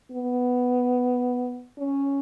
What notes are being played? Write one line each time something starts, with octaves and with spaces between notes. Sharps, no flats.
B3
C#4